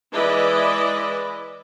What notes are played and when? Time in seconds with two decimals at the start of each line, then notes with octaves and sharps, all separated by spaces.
0.13 E3 G#3 E4 B4 D5 D#5